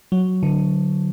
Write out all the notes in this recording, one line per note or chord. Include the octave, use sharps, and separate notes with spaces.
F#3
D3